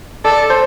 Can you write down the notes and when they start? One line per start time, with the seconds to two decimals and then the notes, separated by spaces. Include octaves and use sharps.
0.25 A4 D5
0.50 C5